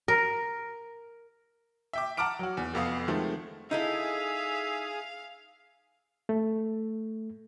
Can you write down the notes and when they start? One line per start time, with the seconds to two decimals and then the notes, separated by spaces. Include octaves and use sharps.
0.08 A#4
1.93 E5 G5 D6
2.17 F#5 A5 A#5 D6 F6 D7
2.39 F#3 F#4
2.57 E2
2.74 F1 F2 B3 F5 D#6
3.08 D#3 F3 G#3 A3 C4
3.71 D#4 E4 G#4 A4 E5 F5
6.29 A3